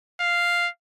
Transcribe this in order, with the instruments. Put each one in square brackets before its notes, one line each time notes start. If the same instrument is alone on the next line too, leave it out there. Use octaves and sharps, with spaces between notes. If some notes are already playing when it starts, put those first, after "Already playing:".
[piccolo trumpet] F5